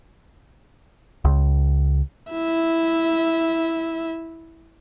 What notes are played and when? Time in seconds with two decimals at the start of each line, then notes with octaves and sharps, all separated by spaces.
1.25 C#2
2.32 E4 E5